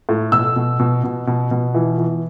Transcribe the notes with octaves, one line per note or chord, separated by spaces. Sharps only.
A2
B2 E6
B2
B2
B2
B2
B2
E3
E3